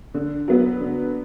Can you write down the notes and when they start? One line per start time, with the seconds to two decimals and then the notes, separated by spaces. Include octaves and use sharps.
0.14 D3
0.48 F#3 B3
0.81 D3